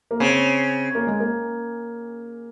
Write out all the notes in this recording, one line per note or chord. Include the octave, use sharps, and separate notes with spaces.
A#3
C#3 C4
A#3
G#3
A#3